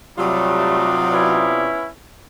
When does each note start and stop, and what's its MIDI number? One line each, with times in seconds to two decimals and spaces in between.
0.18 1.67 48
0.18 1.47 54
0.18 1.00 55
0.18 1.00 57
0.18 1.77 63
0.18 1.67 65
0.18 1.67 74
1.13 1.87 59
1.13 1.87 61
1.13 1.87 64